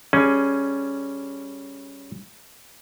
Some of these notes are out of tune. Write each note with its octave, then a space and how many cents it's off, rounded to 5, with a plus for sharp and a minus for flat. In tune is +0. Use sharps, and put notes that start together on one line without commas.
G3 +0 C#4 +0 G#4 +15